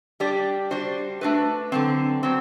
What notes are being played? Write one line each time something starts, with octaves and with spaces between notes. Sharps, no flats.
G3 D4 G4 D5
G3 D4 F#4 C5
A3 D4 F#4 B4
D3 F#3 C4
F#3 C4